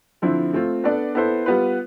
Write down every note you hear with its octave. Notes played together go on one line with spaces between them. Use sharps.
D3 F3 C4 E4
A3 C4 F4
B3 D4 A4 D5
B3 E4 A4 C5
G3 B3 F4 B4